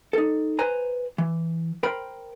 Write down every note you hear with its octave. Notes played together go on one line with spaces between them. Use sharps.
D#4 A4
B4 C5 G#5 A#5
E3
A#4 C5 G5 B5